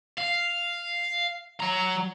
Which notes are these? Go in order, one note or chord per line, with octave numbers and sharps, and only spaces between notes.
F5
F#3 A#5